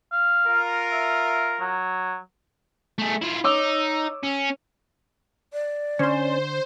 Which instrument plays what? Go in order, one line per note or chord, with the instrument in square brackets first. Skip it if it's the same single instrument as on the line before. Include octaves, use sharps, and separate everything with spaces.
[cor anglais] F5
[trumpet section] F4 A#4
[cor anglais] E5
F#3
[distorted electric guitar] A3 G#4
E4 F4
[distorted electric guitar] D#4 [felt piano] C#5 D6 E6
[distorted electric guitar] C#4
[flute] D5
[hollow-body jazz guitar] D3 C6 [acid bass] C#4 [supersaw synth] C5